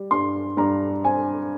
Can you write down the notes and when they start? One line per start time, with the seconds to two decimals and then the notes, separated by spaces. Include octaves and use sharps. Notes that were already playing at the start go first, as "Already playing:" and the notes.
Already playing: G3
0.11 G2 C6
0.57 G2 A#5
1.04 C4 G#5